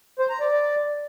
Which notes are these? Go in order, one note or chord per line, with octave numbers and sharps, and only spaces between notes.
C5
A#5
D5